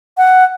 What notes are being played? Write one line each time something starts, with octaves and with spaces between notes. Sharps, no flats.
F#5